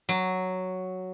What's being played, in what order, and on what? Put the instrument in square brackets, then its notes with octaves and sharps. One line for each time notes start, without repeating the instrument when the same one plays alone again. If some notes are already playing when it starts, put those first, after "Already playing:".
[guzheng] F#3